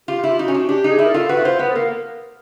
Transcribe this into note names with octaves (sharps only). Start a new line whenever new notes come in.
F4 G4
E4
F4
D#4 F#4
C#4
D4
D4 G4
D#4
G#4
E4
A#4
F4 A4
F#4 B4
E4
F4 C5
B3 B4
A4
A#3 A#4